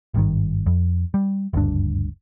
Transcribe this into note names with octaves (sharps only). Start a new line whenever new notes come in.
G#1 G2 C3 D#3
F2
G3
F#1 D2 G2 D4